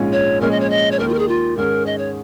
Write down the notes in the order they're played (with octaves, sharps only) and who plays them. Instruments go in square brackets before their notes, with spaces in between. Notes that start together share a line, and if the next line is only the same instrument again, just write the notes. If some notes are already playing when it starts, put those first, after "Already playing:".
Already playing: [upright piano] A#1 G#2 G#3 C#4 F4
[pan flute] C#5
[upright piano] A#2 F3 G#3 C#4 [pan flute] A#4
[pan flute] D#5
C#5
D#5
C#5
[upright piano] D#2 D#3 A#3 [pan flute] A#4
[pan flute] F4
A#4
G#4
F4
[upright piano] G#2 D#3 C#4 G#4 [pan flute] A#4
[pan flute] D#5
C#5